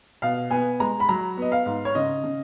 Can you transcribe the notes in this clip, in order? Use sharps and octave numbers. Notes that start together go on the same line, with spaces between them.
B2 F5
B3 G#5
G#3 A#5
B5
F#3 A#5
B3 D#5
F5
G#2
C#5
C#3 D#5
C#3